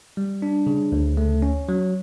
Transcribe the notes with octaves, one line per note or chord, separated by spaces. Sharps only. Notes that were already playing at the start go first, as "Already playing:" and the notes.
G3
D4
C#3
D2
A3
C#4
F#3